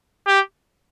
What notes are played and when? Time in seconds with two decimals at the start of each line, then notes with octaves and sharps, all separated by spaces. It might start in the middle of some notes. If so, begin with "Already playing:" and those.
0.27 G4